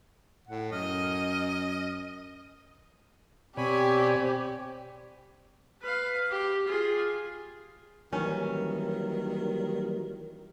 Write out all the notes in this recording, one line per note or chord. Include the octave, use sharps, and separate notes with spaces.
A2 F#5
F#2 D#5 F6
B2 C4 G4 C#5 D5 G#5 B5
B4 F5
G4
F4 G#4
D#3 E3 F#3 G3 A#3 C#4